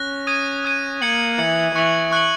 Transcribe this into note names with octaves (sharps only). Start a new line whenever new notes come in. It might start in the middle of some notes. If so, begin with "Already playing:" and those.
Already playing: C#4 F#6 A#6
D#6 G#6 D#7
D#6 G#6 D#7
A#3 G#6 C#7 F#7
E3 G#6 C#7 F#7
E3 C#6 F#6 C#7 F#7
C#6 F#6 C#7 F#7